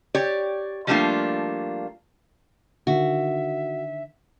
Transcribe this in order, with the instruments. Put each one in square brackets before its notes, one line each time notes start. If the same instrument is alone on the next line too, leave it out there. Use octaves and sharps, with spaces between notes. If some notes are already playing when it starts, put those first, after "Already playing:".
[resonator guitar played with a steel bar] G4 C#5 D5
F3 G3 A3 A#3 D4 F4
[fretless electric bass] D3 D#3 [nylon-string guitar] F#4 [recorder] E5